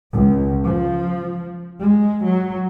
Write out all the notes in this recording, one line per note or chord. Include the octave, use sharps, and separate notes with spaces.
C#2
F3
G#3
F#3